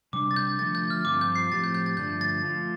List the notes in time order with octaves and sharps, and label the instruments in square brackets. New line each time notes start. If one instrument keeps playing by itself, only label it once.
[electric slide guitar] C3 G3 D4 [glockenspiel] D6
[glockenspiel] A6
G6
[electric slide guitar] D3 F3 A3 [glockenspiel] A6
[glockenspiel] G6
F6
[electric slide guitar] G2 F3 C4 F4 [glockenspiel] D6
[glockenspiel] G6
C7
[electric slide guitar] A2 F3 C4 G4 [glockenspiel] A6
[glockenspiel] G6
G6
A6
[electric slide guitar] G2 D3 F3 A3 D4 [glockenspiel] G6
[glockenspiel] A6
[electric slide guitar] F3 A3 F4